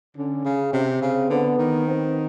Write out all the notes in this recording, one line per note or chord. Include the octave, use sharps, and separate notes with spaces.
D3 C#4
C#3
C3 C4
C#3
D3 B3
D#3
C4